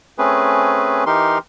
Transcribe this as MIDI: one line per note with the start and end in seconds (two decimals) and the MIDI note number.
0.18 1.04 57
0.18 1.04 60
0.18 1.04 61
0.18 1.04 68
0.18 1.04 71
1.06 1.38 52
1.06 1.38 63
1.06 1.38 67
1.06 1.38 70
1.06 1.38 84